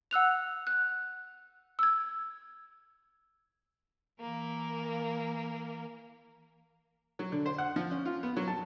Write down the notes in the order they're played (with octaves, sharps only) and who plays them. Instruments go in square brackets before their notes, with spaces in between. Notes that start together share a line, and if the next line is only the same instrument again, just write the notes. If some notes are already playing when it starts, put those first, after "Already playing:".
[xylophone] F#5 E6 F#6 F7
F#6
E6 G#6
[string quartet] E3 A#3 A#4
[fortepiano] F#3
D3
C5
F#5
F3
C#4
F4
B3
F#3
A5